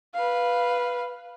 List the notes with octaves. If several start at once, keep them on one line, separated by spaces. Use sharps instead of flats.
B4 F5